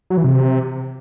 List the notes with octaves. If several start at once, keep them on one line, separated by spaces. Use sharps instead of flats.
F#3
E3
C3